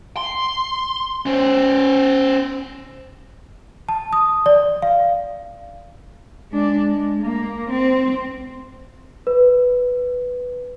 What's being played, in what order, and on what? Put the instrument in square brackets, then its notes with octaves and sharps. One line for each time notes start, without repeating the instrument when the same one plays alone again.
[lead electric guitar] C6
C#4 C5
[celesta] A5
D#6
D5
F5
[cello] G#3 D4
G#3
A#3
C4
[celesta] B4